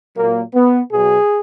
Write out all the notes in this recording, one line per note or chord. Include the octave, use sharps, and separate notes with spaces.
A#2 F#3 A#3
B3
B2 F#3 G#4